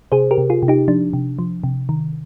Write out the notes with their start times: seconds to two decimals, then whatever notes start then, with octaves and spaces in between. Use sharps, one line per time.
0.12 C3 G#4 C5
0.31 G4 A#4
0.38 C3
0.50 F4 G#4
0.63 C3
0.68 D#4 G4
0.88 F3 D4
1.13 C3
1.39 F3
1.64 C3
1.89 D#3